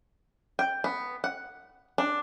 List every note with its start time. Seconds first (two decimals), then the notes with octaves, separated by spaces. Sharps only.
0.59 G5
0.84 B3
1.24 F#5
1.98 D4